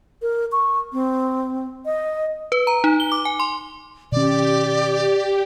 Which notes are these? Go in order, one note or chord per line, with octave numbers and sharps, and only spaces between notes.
A#4
C#6
C4
D#5
B4
A#5
D#4
G7
D6
G#5
C6
B2 D#3 C#4 G4 D5